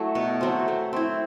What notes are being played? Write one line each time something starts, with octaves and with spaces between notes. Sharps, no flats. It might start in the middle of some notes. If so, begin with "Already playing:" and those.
Already playing: F#3 A3 E4
B2
F#3 A3 C4
A3
C4 E4